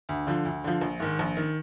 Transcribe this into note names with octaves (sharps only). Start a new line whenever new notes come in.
D2
D3 F3
D2
D3 F3
A#1
G#2 D#3
A#1
D#3